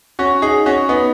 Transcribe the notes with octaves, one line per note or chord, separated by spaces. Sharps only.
C#4 F#4
D#4 G#4
C#4 F#4
B3 D#4